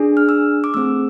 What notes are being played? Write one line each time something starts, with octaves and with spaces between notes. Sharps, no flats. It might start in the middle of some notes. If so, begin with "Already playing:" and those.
Already playing: D4 G#4
F6
E6
D6
A3 C4 G#4 E6